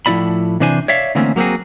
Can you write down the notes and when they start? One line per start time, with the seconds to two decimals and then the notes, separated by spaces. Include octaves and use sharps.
0.06 A2 F3 D#4 E4 D5 B5
0.60 C3 E3 D4 C5 G#5
0.88 C#5 D5 E5 F5
1.15 D3 E3 A3 A#3 C4 C#4
1.36 F#3 A#3 C4 F#4 G#4